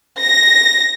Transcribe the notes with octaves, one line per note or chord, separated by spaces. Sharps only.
A#6